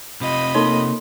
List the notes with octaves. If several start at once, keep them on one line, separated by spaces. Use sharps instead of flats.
C3 F4 D#5 B5
A#3 D#4 A4 C#5 C6 G7